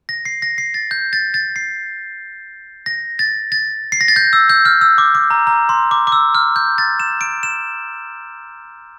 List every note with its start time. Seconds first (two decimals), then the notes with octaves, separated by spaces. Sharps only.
0.09 A#6
0.25 C7
0.42 A#6
0.58 C7
0.74 A6
0.91 G6
1.13 A6
1.34 A6
1.56 C7
2.86 A#6
3.19 A6
3.52 A6
3.92 C7
4.01 A#6
4.08 A6
4.16 G6
4.33 E6
4.50 G6
4.65 F6
4.81 E6
4.98 D6
5.15 D6
5.30 A#5
5.47 A#5
5.69 C6
5.91 D6
6.07 D6
6.12 E6
6.35 F6
6.56 G6
6.78 A6
7.00 E7
7.21 D7
7.43 E7